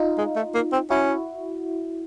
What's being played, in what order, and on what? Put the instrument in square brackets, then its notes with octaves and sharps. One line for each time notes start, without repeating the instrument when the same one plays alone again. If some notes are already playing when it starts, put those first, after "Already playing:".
Already playing: [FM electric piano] D#4 F4
[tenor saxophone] G#3
A3
A#3
C4
[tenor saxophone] C#4 [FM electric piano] E4 F#4